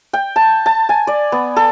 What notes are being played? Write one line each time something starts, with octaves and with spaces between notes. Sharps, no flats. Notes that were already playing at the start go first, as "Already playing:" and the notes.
G5
A5
A5
G#5
D5
B3
A4